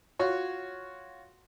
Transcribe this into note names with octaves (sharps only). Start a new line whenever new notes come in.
F4 F#4 C#5